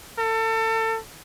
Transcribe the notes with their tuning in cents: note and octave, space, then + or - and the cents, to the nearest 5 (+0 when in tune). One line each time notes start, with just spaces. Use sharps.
A4 +30